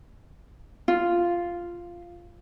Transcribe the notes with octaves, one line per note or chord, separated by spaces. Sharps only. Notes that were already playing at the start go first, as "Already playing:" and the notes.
F4